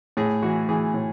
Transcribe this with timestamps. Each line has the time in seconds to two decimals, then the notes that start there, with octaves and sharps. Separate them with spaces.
0.17 A2 G#4
0.42 E3 F#4
0.69 E3 G#4
0.94 A2